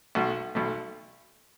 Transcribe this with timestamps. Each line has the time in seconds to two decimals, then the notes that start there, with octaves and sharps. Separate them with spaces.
0.15 B1 B2 A3
0.55 B1 B2 A3